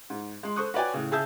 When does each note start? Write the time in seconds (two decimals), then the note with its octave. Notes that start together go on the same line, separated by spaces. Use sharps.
0.10 G#2
0.43 G#3 C6
0.56 A4 C5 C#6 D#6 F#6
0.74 F#4 B4 C#5 D5 G5 G#5
0.94 A2 C#3
1.11 C#3 G#4 E5 A5 E6 G6